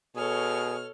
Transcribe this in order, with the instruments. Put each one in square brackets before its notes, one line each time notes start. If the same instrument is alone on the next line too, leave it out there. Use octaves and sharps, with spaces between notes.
[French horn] B2 [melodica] G#4 [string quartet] A4 C#5 F6